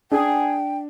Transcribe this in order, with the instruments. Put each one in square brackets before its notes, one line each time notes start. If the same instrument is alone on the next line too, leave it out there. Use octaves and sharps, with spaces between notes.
[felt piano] D4 [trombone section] G#4 [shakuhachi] G5